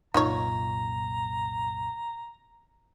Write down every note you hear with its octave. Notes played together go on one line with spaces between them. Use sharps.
C2 F#2 A#2 D#4 F4 C#5 A#5